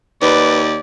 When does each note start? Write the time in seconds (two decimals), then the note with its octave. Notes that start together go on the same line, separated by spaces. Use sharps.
0.22 D#2 B4 D5